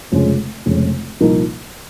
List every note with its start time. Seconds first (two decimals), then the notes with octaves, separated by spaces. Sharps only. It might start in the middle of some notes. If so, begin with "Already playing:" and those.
0.12 F1 F2 C#3 G#3
0.66 F1 F2 C#3 G#3
1.20 C2 A#2 F3 A#3 D#4